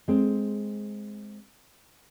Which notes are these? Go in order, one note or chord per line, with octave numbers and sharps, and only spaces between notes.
G#3 C4